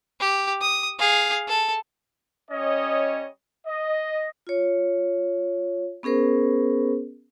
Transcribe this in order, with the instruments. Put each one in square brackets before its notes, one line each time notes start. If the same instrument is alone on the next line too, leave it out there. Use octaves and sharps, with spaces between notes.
[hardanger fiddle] G4
D#6
G#4 F5
A4
[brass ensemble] G3 C#4 C#5 D#5
D#5
[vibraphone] F4 C#5
B3 C#4 G#4 A#4 C5